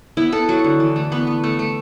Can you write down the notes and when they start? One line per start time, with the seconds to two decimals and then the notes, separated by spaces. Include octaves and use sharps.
0.17 B3 E4
0.32 B3 A4
0.49 F#3 F#4
0.64 D3
0.80 E3
0.96 A3
1.12 B3 B4
1.27 B3
1.44 A3
1.59 A3